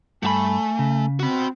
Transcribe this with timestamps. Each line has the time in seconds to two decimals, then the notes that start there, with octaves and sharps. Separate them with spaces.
0.23 G2 A3 G4 G#5 B5
0.79 C#3
1.20 C4 F#4 B5